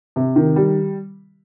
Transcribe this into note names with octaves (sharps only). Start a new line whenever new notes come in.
C3
D#3
G3